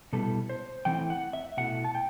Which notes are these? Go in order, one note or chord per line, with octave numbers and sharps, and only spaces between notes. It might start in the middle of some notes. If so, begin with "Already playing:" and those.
B2 G3 B3 E4 A4
C5
E3 A3 C4 E4 G5
F#5
E5
B2 A3 E4 F#5
A5
G5